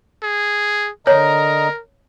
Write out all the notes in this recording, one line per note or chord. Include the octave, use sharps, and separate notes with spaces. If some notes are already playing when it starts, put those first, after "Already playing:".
G#4
D3 A#4 C#5 D#5 A#5